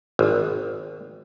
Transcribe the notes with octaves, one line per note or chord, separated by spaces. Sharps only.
G#1